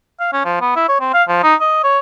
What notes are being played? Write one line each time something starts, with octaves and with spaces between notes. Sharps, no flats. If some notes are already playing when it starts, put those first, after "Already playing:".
F5
C#4
F3
B3
E4
C#5
C4
F5
F3
D#4
D#5
C#5